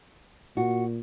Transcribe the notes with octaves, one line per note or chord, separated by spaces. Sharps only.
A#2 F#4